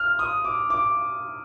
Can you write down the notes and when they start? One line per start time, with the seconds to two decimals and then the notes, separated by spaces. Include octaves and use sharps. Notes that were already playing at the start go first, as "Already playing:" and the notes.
Already playing: F6
0.19 D#6
0.45 D6
0.70 D6